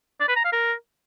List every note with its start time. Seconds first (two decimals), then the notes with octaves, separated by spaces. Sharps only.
0.20 D5
0.28 B4
0.36 A#5
0.45 F5
0.53 A#4